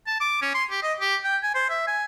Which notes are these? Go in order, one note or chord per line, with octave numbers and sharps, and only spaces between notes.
A5
D6
C#4
C6
G4
D#5
G4
G5
G#5
C5
E5
G#5